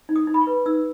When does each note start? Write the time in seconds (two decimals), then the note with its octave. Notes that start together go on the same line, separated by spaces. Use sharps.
0.09 D#4
0.16 D#6
0.27 D#4
0.34 B5
0.41 C#6
0.47 B4
0.66 D#4 E6